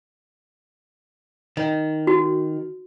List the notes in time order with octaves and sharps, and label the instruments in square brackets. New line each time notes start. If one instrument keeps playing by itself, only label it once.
[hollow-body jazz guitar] D#3
[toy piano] F#4